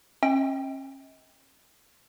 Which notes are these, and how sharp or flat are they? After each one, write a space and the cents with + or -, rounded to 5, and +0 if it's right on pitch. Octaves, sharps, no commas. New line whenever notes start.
C#4 -35 D#5 +40 G5 +5